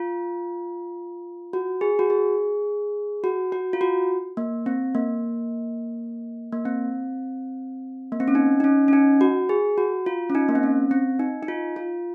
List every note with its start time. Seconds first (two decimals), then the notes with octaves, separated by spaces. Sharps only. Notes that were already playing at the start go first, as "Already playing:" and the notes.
Already playing: F4
1.53 F#4
1.81 G#4
1.99 F#4
2.10 G#4
3.24 F#4
3.52 F#4
3.73 F4
3.81 F#4
4.37 A#3
4.66 C4
4.95 A#3
6.52 A#3
6.65 C4
8.12 A#3
8.20 C4
8.28 C#4
8.35 D#4
8.60 D#4
8.64 C#4
8.88 C#4
8.93 D#4
9.21 F#4
9.49 G#4
9.78 F#4
10.06 F4
10.30 C#4
10.35 D#4
10.49 A#3
10.55 C4
10.63 C#4
10.91 C4
11.20 D#4
11.43 D#4
11.48 F4
11.76 F4